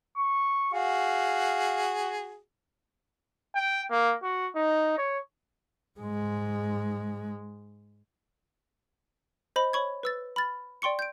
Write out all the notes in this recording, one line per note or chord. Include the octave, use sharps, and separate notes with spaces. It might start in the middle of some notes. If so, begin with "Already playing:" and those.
C#6
F#4 G#4 F5
G5
A#3
F#4
D#4
C#5
G#2 G#3
C5 D#5 B5
C#5 B5 C#6 G#6
B4 E6 A6
B5 F6 A6
D5 G5 C6 C#6 C#7
G6 D7